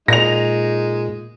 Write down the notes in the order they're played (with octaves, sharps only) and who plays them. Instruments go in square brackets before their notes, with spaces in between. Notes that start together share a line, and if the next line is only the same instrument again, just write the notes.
[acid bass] A#2 [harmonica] G#3 D#4 [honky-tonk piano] A#6 F7